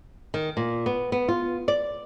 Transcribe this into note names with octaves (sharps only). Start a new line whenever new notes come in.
D#3
A#2
B3
B3
F4
D5